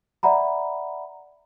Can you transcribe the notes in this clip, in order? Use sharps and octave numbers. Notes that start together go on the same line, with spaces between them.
D5 E5 F#5 A#5 B5